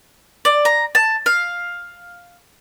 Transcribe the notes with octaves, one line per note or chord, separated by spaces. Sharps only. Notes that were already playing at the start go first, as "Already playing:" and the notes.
D5
A#5
A5
F5